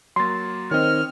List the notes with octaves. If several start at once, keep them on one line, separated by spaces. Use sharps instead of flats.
F#3 A#3 C6 A6
D#3 C4 C#5 D#5 F6